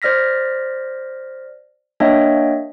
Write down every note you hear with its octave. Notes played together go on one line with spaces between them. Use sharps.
C5 D5 F6 A#6 B6
A#3 D4 C#5 D#5 E5 G5